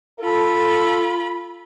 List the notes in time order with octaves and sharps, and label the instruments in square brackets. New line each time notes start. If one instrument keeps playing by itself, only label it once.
[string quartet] F4 B5 [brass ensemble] A4